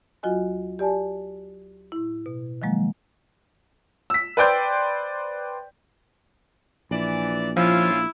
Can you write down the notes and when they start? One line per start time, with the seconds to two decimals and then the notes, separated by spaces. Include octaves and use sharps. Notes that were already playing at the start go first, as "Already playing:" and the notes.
0.23 D2 F#3 F4 F#4 D#5 G#5
0.79 G4 D5 G#5 A5
1.92 A2 E4
2.26 B2
2.62 D#3 F3 F#3 G#3 A#3
4.10 E6 B6
4.37 B4 C5 D5 G5 C6 G6
6.91 A#1 E3 D5
7.57 F3 C#4 E4 F4